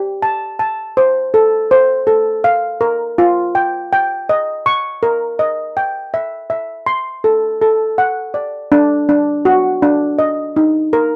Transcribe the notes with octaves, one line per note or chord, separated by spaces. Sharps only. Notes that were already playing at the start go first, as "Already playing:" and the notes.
Already playing: G4
A5
A5
C5
A4
C5
A4
F5
A#4
F4
G5
G5
D#5
C#6
A#4
D#5
G5
E5
E5
C6
A4
A4
F#5
D5
D4
D4
F#4
D4
D#5
D#4
A#4